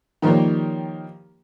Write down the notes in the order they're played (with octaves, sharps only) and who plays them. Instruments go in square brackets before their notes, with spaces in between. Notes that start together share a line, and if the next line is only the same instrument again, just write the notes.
[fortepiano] D#3 F3 G3 A#3 G4 C#5